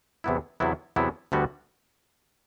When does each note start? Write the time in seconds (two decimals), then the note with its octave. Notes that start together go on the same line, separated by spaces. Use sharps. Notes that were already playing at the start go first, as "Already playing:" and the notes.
0.24 E2 C3 F#3 B3 E4
0.60 E2 C3 F#3 B3 E4
0.96 E2 C3 F#3 B3 E4
1.32 D2 D3 G3 B3 F#4